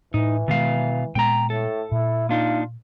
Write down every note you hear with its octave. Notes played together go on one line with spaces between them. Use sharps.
A2 E3 D#4
B2 D#3 G#3 B3 F5
A#2 G#3 B3 G5 A#5
A2 A4
A#2 E4
A#3 D4 D#4 F4